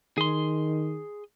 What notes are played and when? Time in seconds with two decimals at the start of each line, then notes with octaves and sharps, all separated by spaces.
0.18 D#3 G#4 C6